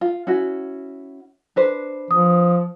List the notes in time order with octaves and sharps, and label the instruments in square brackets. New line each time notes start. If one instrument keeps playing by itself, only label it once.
[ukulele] F4
C#4 E4 F#4
D4 B4 C5
[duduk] F3 [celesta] D#6